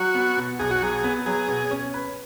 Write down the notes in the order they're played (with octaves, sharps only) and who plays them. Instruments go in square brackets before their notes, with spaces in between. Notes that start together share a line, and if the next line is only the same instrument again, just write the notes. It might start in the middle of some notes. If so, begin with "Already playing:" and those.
Already playing: [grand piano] F#3 [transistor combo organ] F#4
[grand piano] B3
B2
[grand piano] B1 [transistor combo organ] G#4
[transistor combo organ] F#4
[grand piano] F#3 [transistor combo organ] G#4
[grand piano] B3
[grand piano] F#3 [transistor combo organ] G#4
[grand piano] B2
C#4
B4